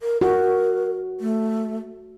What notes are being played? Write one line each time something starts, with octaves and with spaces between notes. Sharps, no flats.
A#4
F#4 A#4
A3